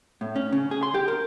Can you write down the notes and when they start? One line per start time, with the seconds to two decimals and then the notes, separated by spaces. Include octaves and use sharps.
0.21 A2
0.36 C#4
0.52 C#3
0.71 G#4
0.83 C6
0.94 G4
1.08 A#4